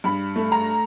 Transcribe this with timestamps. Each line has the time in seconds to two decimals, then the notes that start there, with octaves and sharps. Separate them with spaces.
0.04 G2 B5
0.36 A3
0.52 A#5